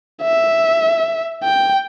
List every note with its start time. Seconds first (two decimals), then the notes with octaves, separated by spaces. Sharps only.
0.22 E5
1.44 G5